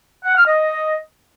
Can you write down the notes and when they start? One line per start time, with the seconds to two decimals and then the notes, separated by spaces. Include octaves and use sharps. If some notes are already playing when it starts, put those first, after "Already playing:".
0.25 F#5
0.36 F6
0.47 D#5